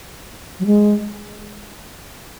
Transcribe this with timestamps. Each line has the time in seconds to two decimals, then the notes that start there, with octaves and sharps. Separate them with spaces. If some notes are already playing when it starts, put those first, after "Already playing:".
0.60 F#3
0.66 G#3